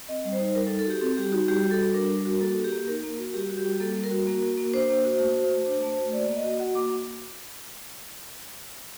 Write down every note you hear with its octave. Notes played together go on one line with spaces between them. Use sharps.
C4 D#5
G3
C5
D#4
G3 A#4
A4
D#4
A4
F#4 G4
C4 A4
G3 G4
D#4 F#4
G3 G4
F#4
A4
G3
D4 A#4
G3
F#4
A#3 A4
F#4
G4
A#3
D#4 A#4
A#3
F#4
G3 G4
F#4
G4
G3
A#3 A4
G3
A#4
F#4
A#3
F#4
A#3
D4 C5
A#3
F#4
A3
F#4
A3
D4
A3
F#4
A#3 D5
A#3
D#5
F#4
F#4 F#5
A#3 D6